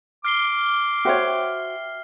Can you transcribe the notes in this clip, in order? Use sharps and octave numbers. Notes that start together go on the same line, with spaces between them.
D6 F6 C7 G7
F#4 C5 C#5 E5 G5